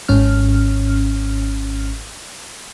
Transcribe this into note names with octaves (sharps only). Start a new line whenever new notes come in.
G#1 G#2 C#4 F6